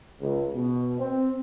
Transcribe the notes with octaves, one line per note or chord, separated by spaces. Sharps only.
C#2
B2
C4